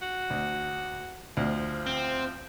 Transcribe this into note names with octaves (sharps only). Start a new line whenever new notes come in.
F#4
D2
D2 F3
C4